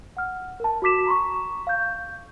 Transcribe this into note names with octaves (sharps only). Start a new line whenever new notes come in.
F#5 F6
A#4 A5
F#4 A5 D6 B6 E7
A#5 C6 C#6
F5 G6